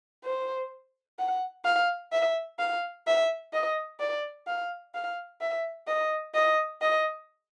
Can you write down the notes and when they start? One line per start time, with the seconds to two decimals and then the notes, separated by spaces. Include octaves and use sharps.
0.24 C5
1.19 F#5
1.65 F5
2.12 E5
2.59 F5
3.07 E5
3.53 D#5
4.00 D5
4.47 F5
4.94 F5
5.41 E5
5.88 D#5
6.34 D#5
6.82 D#5